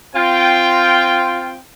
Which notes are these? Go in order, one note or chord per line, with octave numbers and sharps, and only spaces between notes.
C4 F4 G5